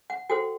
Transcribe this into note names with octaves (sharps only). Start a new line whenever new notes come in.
F#5
F#4 A4 C5 G5